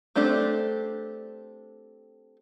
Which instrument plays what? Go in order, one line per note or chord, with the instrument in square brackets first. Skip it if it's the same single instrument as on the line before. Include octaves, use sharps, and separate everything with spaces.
[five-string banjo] A3 C4 D4 G4 A4